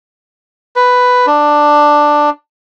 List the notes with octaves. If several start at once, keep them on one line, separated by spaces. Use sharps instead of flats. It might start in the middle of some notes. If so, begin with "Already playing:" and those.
B4
D4